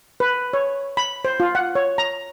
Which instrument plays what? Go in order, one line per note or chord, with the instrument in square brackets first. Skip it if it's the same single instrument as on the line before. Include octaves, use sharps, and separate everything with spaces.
[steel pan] B4
C#5
B5
C5
F4
F#5
C#5
A#5